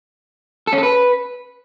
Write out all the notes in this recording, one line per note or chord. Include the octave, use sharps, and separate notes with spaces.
A4
C#4
A4
B4